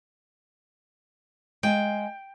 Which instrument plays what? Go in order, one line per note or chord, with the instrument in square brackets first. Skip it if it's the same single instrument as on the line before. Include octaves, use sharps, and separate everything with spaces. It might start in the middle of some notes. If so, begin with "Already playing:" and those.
[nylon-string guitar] G#3 F5 G#5 [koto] G5